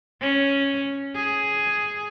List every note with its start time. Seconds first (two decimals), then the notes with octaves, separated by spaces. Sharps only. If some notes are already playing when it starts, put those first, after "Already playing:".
0.22 C#4
1.16 G#4